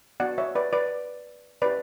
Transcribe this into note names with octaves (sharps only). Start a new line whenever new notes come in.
B3 D4 F#4 D5 F#5
C#5 E5
B4 D5
B4 D5
C#4 E4 G4 B4 D5